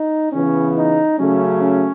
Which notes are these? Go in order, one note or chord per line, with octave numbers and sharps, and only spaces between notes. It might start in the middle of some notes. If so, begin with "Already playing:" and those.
Already playing: D#4
C#3 E3 B3 C#4
D#4
C#3 F#3 A3 C#4
C#4